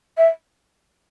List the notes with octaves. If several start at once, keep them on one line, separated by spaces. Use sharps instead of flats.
E5